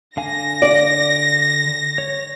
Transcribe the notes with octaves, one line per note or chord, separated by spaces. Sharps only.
D3 F5 G#5 A#6
D5
C#5